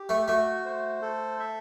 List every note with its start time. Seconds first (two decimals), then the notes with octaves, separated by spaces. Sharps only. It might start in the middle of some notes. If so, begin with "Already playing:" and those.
Already playing: G4
0.09 A3
0.28 A3 F#4
0.65 C5
1.02 A4
1.40 E5